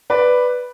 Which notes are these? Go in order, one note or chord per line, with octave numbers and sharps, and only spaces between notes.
B4 D5